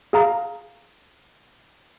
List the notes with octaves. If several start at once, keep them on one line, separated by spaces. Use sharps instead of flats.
G#4 F5 A#5